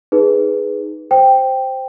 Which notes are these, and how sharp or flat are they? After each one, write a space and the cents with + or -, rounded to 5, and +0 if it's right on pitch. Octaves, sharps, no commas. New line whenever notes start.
D#4 +0 G#4 +0 B4 +0
C5 +0 G5 +0